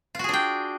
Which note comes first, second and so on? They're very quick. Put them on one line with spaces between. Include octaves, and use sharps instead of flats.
F4 F#4 G#4 D4 G5